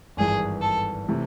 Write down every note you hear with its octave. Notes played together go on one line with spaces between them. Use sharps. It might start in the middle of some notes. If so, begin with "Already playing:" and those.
G#1 G2 E3 G#4
A4
C3 E3 A3